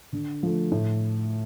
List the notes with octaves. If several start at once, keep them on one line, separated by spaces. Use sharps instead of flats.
D3
F3 A3
A2